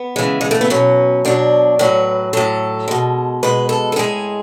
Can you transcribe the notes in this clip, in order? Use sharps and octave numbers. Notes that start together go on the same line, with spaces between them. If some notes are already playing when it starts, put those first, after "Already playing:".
Already playing: B3
C#3 E3 G#3
G#3
A3
B3
B2 F#3 C#4
B2 F#3 D4
A2 F#3 B4
A2 F#3 A4
B2 G#3
B2 G#3 B4
A4
A4
A2 G#3 G#4